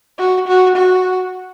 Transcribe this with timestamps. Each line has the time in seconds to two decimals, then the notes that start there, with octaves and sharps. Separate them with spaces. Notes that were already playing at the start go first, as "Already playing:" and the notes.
0.18 F#4
0.47 F#4
0.75 F#4